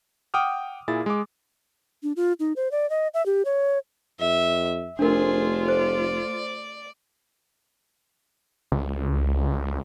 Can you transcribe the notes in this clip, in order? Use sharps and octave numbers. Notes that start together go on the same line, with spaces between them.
F#5 G5 D6 D#6 F6
A#2 E4 G#4 A6
G#3 D6
D4
F4
D#4
C5
D5
D#5
E5
G4
C#5
F2 E5
F1 A3 D4 F4 G#4 A#4 C5
C5 D5
C#2